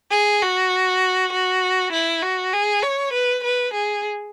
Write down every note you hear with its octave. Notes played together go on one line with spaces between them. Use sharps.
G#4
F#4
F#4
E4
F#4
G#4
C#5
B4
B4
G#4